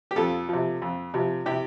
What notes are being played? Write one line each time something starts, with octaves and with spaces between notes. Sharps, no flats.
G4
F2 F4 A4
C3 F3
F2
C3 F3
C3 E4 G4